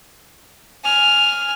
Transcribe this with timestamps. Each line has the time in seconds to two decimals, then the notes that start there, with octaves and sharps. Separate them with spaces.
0.83 G#5 F6